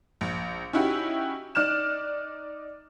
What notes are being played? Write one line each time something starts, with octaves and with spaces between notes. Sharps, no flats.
A#1
C#4 D#4 E4 F#4 G4
D#4 D5 F6 F#6 E7